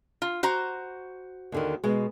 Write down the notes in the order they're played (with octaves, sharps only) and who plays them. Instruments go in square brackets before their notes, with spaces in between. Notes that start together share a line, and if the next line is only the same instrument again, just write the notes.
[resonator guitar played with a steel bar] F4
F#4 C5 A#5
[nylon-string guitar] D#2 D3 D#3
B2 G#3